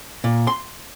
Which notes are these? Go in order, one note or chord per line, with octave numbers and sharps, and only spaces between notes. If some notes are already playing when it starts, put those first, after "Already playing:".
A#2
C6